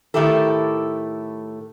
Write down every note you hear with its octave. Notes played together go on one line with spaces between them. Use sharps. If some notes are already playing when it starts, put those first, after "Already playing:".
A2 D#3 A3 E4 G4 A4